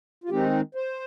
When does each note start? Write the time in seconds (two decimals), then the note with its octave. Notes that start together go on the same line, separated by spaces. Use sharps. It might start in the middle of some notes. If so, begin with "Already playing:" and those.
0.24 F4
0.29 D#3 G#3 C4 D#4 G4
0.75 C5